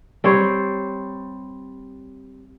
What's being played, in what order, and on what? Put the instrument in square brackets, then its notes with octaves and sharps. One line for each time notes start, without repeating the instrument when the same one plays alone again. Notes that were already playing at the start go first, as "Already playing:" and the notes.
[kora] G3 C4 C5 C#5